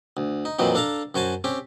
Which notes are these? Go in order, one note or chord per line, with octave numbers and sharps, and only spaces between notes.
D2
D#4
F2 A#2 E3 F#3 C4 D#4
D4 A4 F5 A5 A#5
F#2 F#4 C5 G#5 A5
C4 C#4 G4